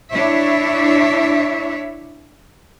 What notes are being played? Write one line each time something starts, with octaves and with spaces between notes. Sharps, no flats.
D4 E4 C#5 E5